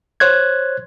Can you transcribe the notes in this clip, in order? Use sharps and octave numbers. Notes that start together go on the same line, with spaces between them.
C5 C#5 F#6 G#6